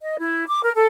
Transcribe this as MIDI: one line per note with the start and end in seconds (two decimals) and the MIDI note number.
0.01 0.17 75
0.18 0.44 64
0.48 0.60 86
0.63 0.71 70
0.76 0.86 69